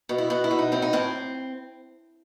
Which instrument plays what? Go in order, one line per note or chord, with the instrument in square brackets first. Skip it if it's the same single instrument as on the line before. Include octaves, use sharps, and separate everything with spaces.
[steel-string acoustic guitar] B2
E4
B2 F#4
E4
B2
D#4
A2 C4
D#4
A2 C4